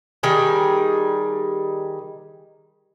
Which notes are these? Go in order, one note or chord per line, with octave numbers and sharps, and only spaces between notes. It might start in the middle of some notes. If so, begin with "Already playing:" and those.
D#3 G3 G#4